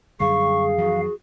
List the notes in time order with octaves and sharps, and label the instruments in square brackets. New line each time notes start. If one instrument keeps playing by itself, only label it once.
[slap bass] F#2 D3 G3 [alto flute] G#4 [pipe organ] F5 [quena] C#6
[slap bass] F#2 E3 F3 [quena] F#4